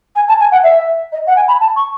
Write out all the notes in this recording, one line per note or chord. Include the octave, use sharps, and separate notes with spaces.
G#5
A5
G#5
F#5
E5
D#5
F#5
G#5
B5
A5
C#6